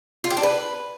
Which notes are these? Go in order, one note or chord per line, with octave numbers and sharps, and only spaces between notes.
F4
G4
D4
B4